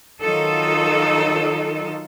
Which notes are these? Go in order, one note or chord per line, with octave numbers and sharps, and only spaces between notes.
D#3 F#3 D#4 F4 A4